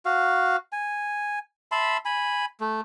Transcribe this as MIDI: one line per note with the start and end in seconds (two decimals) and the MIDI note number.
0.05 0.57 66
0.05 0.57 77
0.72 1.39 80
1.72 1.97 76
1.72 1.97 81
1.72 1.97 83
1.72 1.97 84
2.05 2.45 80
2.05 2.45 83
2.60 2.81 57